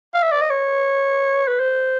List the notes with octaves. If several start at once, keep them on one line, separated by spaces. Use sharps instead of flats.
F5
E5
D5
D#5
C#5
B4
C5